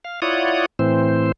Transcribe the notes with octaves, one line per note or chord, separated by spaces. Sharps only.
F5
E4 F4 C#5 D5 F#5 D#6
A2 E3 C4 C5